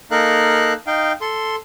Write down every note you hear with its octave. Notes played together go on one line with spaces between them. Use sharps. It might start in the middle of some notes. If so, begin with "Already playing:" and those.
A#3 D#4 A4 A#4 F5 F#6
D#4 F5 G5
A4 C6